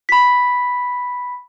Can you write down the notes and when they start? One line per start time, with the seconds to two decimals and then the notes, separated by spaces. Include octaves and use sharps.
0.09 B5 B6